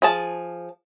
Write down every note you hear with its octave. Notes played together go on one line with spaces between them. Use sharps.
F3 G#4 A5